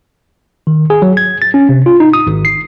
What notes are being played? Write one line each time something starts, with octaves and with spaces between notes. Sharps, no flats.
D#3
G#4
F#3
G#6
A6
C#4
C3
F4
D#4
D#6
G#1
C7